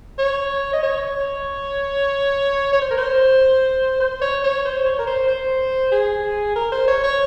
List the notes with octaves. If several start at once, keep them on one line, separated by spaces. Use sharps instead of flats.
C#5
D#5
C#5
C#5
C5
A#4
C5
C5
C#5
C#5
C5
C#5
A#4
C5
C5
G#4
A#4
C5
C#5
C#5